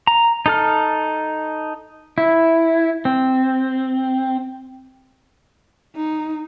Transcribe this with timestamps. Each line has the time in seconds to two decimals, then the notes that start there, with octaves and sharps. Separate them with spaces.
0.07 A#5
0.46 D#4 A4 F6
2.18 E4
3.05 C4
5.96 D#4